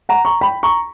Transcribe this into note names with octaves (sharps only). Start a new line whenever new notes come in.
F#5 A#5
A#5 C#6
G5 B5
A#5 C#6